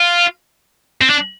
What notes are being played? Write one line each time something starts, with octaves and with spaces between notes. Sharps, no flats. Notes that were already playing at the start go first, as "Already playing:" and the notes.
Already playing: F4
C4
D4